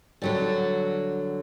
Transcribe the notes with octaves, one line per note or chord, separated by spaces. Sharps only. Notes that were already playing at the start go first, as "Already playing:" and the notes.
D3 F#3 G3